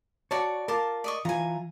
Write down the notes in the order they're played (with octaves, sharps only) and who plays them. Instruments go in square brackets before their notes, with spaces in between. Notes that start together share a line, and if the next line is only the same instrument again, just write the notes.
[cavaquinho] F#4 D5 A5 [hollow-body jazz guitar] C#5
[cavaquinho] F4 A5 D6 [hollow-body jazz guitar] A#4
[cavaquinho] D5 D#5 C#6
[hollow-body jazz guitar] E3 F4 [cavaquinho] G#5 A#5